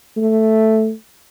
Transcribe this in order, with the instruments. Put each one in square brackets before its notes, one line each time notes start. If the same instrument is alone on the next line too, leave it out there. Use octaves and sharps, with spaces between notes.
[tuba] A3